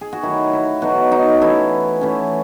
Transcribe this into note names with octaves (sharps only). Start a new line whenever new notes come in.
G#4
F#4
D#3 F#3 A3 E4
E4
B2 F#3 A3 D#4 F#4
D#4
E3 A3 C#4 E4
E3 A3 C#4